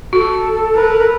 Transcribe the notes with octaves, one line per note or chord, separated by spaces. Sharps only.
F#4 A4
A#4 B4